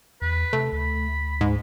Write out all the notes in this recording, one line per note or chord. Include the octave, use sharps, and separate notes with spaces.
E2 B4
C3 A3
D2 B5
G#2